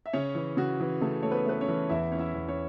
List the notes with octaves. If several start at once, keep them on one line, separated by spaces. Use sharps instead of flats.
E5
C#3 C#4 C#5
E3
C#3 F#4
E3
C#3 A3 A4
A3 C#5
B3 B4
A3 B4
C#4 C#5
E3
E2 E4 E5
C#4
E4 E5
E2
C#4 C#5